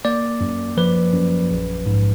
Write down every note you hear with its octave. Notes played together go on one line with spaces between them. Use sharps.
A#3 D5
F#2
F3 B4
F#2
A#1
G#2